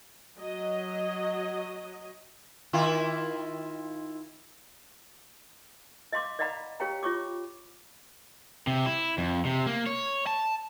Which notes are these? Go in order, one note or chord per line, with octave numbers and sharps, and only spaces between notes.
F#3 D#5
D#3 E4 F4
D#5 F5 C6 D6
D5 D#5 F5 F#5 A#5 B5
G4 C#5 F5 G5 A#5
F4 C#5 C#6 D6
C3
E4
F2
C3
A#3
C#5
A5